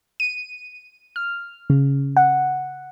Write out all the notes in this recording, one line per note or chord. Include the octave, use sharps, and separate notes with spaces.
D#7
F6
C#3
F#5